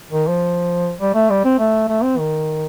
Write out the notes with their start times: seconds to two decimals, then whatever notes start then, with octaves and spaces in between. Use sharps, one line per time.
0.11 D#3
0.27 F3
1.01 G3
1.15 A3
1.30 G3
1.45 C4
1.59 A3
1.88 A3
2.03 C4
2.18 D#3